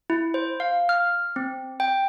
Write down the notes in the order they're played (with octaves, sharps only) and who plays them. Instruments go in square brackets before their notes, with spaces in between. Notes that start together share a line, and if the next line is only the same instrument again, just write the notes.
[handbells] E4
C5
F5
F6
C4
G5